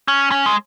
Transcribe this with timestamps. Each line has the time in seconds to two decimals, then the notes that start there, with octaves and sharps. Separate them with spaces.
0.08 C#4
0.32 C#4
0.46 G#3